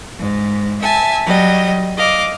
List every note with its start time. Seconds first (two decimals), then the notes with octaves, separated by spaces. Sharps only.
0.19 G#2
0.82 E5 G#5 A5
1.25 F#3 G3 D#5
1.98 D#5 F5 D6